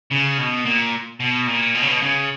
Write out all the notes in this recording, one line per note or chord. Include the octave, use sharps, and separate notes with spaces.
C#3
B2
A#2
B2
A#2
B2
C#3
B2
C#3